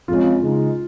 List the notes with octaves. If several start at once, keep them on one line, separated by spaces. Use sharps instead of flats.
F2 C#3 G#3 F4
C#3 G#3 D#4